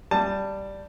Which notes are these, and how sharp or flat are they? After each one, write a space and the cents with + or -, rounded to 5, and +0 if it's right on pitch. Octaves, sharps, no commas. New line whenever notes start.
G3 +0 A5 +15